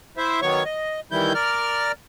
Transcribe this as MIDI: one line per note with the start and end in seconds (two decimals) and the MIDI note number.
0.17 0.40 64
0.17 0.40 72
0.17 0.40 76
0.42 0.64 51
0.42 0.64 54
0.42 0.64 59
0.42 0.64 73
0.42 0.64 85
0.65 1.00 75
1.12 1.33 51
1.12 1.33 52
1.12 1.33 55
1.12 1.33 64
1.12 1.33 91
1.35 1.92 70
1.35 1.92 74
1.35 1.92 89